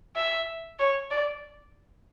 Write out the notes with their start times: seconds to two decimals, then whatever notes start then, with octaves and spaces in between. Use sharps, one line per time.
0.16 E5
0.79 C#5
1.11 D5